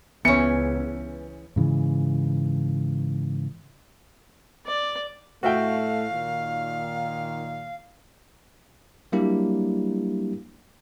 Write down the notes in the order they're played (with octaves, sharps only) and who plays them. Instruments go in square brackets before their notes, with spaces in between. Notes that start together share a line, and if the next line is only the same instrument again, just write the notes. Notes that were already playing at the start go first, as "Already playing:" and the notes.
[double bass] C#2 [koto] E3 C#4 [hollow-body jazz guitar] B3 C#5 [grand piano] C#7
[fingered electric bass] G#2 C#3 E3
[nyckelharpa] D5
[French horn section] A2 A3 [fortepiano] F#4 E5 G5 [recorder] F5
[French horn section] A#2 D#3
[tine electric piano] F#3 G3 A#3 D4 E4 G4